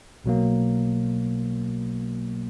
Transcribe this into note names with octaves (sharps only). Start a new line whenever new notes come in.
B1 B2 F#3 A#3